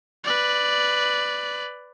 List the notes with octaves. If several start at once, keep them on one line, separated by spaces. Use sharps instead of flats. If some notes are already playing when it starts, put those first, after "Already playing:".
B4 D5